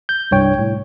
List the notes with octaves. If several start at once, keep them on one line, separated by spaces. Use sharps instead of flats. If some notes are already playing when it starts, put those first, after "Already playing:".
G6
C2 G2 C#5 G5
A2